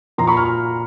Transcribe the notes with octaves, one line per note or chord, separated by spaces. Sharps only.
A#2 F3 A#5 C6
B5 C#6
F6